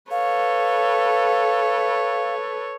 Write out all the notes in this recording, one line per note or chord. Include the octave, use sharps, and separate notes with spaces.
A4 B4 C#5 F5